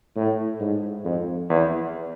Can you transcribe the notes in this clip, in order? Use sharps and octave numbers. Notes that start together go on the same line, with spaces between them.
A2
G#2
F2
E2